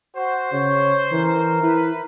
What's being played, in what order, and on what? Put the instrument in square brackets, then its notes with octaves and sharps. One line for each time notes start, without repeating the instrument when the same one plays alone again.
[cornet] F#4 [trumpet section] C5
[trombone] C#3 [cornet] C#5
[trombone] E3 [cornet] A#4
[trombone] E4 [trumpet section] B4